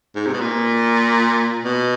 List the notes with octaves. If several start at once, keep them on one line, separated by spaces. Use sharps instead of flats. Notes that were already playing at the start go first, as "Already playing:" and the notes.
G#2
C3
B2
A#2
B2